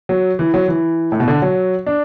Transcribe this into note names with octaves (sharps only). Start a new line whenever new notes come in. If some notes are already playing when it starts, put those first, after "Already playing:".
F#3
E3
F#3
E3
A2
B2
D3
F#3
D4